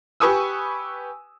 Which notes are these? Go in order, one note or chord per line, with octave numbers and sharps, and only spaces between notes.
G4 B4 G#5 C#6 D#6 E6